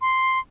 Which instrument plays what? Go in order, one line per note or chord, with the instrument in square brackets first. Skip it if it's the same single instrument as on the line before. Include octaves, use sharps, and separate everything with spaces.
[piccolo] C6